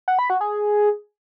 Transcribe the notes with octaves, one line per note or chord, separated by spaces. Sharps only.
F#5
B5
F#4
G#4